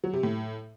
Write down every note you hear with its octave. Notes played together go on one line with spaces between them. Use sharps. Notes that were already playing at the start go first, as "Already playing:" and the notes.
F#3
C3
A2